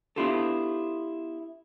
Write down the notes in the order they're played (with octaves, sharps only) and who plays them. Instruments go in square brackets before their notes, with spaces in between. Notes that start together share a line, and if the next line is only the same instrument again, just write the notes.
[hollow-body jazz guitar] B3 D4 E4 F4 G4 A4